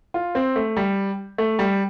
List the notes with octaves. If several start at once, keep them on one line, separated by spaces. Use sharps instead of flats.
F4
C4
A3
G3
A3
G3